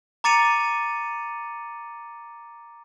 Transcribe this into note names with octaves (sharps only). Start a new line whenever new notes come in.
A#5 D6 A6 C#7 D#7 F7